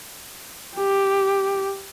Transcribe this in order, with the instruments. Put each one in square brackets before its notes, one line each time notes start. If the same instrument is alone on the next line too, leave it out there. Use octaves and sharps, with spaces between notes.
[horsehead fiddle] G4